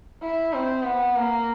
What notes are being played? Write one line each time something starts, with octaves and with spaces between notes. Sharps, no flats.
E4
C4
B3
A#3